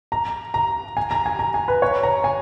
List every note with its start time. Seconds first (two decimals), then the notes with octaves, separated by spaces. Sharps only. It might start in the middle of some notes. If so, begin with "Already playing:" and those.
0.12 A#5
0.54 A#5
0.97 G#5
1.11 A#5
1.26 G#5
1.39 A#5
1.54 G#5
1.68 B4
1.82 C#5
2.03 A#5
2.24 G#5